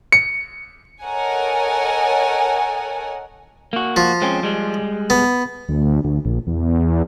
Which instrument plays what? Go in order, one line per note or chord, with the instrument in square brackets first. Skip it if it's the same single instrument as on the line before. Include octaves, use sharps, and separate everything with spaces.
[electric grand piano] C#7
[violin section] A4 A#4 C#5 D#5 F#5 G#5
[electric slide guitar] A#3 F#4
[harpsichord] F3
[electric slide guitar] G#3 C4 C#4
G3 G#3
[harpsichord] B3
[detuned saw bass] D2
D2
A#1
E2